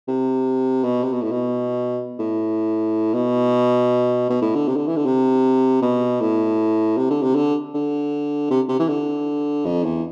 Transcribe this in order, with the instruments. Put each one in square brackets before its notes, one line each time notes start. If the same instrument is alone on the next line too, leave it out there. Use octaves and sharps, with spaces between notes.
[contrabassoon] C3
B2
C3
B2
A2
B2
A2
B2
B2
A2
D3
C3
D3
E3
D3
C3
B2
A2
C3
D3
C3
D3
D3
C3
C3
E3
D3
F2
E2